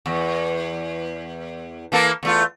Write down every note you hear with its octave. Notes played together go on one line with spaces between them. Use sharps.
E2
E3 A#3 A4
E2 A3 F4